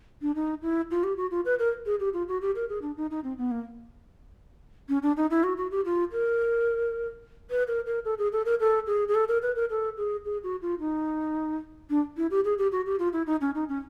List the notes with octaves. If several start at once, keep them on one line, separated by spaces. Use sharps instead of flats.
D4
D#4
E4
F4
G4
F#4
F4
B4
A#4
G#4
G4
F4
F#4
G4
A#4
G#4
D4
D#4
D#4
C4
B3
A#3
C#4
D4
D#4
E4
F#4
F#4
G4
F4
A#4
B4
A#4
A#4
A4
G#4
A4
A#4
A4
G#4
G#4
A4
A#4
B4
A#4
A4
G#4
G#4
F#4
F4
D#4
D4
E4
G4
G#4
G4
F#4
G4
F4
E4
D#4
C#4
D#4
C#4